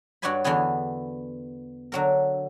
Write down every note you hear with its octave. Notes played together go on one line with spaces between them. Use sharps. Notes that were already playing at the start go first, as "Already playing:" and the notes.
G2 F#4 C#5 D5 G#5 B5
E2 D3 E3 B3 G#4
D3 F#3 A#4